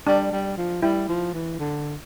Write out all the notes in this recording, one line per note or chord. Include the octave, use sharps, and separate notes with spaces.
G3 D4
G3
F3
G3 E4
F3
E3
D3